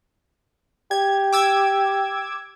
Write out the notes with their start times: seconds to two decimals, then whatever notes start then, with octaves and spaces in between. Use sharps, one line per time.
0.91 G4 G#6
1.33 D6 E6 G#6